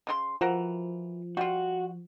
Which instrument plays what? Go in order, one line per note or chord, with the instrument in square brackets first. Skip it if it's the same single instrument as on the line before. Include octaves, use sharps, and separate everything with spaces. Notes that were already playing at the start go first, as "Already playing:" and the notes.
[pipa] C#3 F4 C6
[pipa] E3 F#4 A#4 [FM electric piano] F3
[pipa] G3 F4 [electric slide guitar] F#4